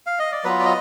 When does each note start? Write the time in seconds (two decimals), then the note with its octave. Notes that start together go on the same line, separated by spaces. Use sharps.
0.06 F5
0.19 D#5
0.32 D5
0.44 F#3 B3 F4 B4
0.59 D5
0.65 D#5